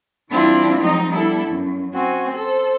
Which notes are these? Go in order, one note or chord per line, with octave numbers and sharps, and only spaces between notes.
E3 G3 C4 D4 E4 F4
F3 F#3 G#3 C4 D#4
G3 B3 D4 E4 A4
F#2
C4 F#4 G#5
A4 C5